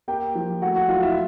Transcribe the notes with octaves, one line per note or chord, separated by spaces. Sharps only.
A#3 G4 G5
F3
A3 F#4 F#5
F#4 F#5
F#3 F4 F5
E4 E5